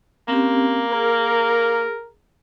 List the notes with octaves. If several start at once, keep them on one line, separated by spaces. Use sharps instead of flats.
A#3 C4 C#4 G4
G#4 A#4